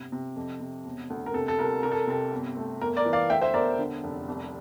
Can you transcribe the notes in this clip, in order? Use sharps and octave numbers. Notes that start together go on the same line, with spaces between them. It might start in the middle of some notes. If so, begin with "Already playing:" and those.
Already playing: G1 C3
C3
F2
C3
E1
D2
A#4
C3 A4
A4
C2 A#4
C2 A#4
A4
C3 A4
G1
A3
G1 A#4
A#4 D5
E3
D5 F5
D2 E5 G5
C5 E5
E1 A#4 D5
D3
F1
C2